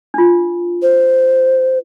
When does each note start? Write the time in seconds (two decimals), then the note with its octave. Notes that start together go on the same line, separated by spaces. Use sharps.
0.14 D4 F4
0.82 C5